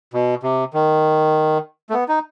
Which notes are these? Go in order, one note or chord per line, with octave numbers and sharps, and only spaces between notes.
B2
C3
D#3
A3
B3
D#4